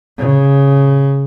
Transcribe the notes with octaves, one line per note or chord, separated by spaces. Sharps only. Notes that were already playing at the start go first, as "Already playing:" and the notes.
C#3